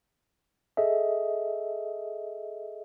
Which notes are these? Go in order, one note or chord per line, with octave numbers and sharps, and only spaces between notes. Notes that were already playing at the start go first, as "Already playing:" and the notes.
G#4 A4 D#5 E5